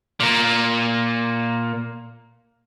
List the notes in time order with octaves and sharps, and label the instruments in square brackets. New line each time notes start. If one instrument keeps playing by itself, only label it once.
[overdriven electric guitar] A#2 A#3